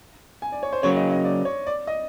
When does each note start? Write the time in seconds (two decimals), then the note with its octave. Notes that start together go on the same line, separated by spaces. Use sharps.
0.42 G#5
0.52 D5
0.63 C#5
0.73 C5
0.83 C#3 F#3 A#3 C#5
0.97 D#5
1.11 D#5
1.24 D5
1.45 C#5
1.66 D5
1.87 D#5